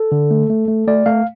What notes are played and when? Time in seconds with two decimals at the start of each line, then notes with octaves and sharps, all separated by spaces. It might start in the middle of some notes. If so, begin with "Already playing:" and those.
Already playing: A4
0.12 D3
0.31 A3
0.50 A3
0.68 A3
0.87 A3 D5
1.06 A3 F5